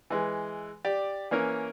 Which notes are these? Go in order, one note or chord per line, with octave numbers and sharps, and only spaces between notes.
E3 G#3
G4 D5
E3 A#3 C#4 A#4